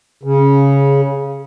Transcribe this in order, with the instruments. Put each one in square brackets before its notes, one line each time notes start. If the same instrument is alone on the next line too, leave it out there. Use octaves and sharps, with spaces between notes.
[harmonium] C#3